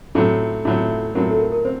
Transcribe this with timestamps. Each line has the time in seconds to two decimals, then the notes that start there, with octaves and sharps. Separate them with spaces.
0.15 A2 F#3 C4 A4
0.65 A2 F#3 C4
1.15 A2 F#3 C4 A#4
1.30 A4
1.39 A#4
1.52 A#4
1.65 C4 C5